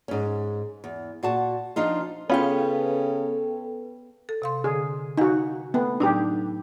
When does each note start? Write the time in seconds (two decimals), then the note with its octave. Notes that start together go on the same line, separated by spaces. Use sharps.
0.08 G#2 C#4
0.84 E2
1.23 A#2 F#4 A5
1.76 F3 D4 D#4 F4
2.30 C#3 B3 C#4 F4 A4 B4 G5
4.29 A4
4.42 C3 F5 C6
4.64 D3 G#4
5.18 D#4 F#4 F5 F#5 G#5
5.74 A3 B3 A4 G5
6.00 A2 F#3 D4 D#4 G4